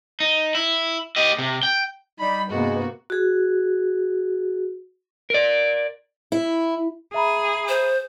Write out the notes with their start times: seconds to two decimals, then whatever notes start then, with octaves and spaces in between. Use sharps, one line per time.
0.20 D#4
0.55 E4
1.16 G4 D#5
1.39 C3
1.63 G5
2.19 G3 D#4 B5
2.50 G2 C3 G#3 A#3 B3 F#4
3.10 F#4 G#4
5.30 A#4 D5
6.32 E4
7.14 G#4 E5 A#5 B5
7.69 C5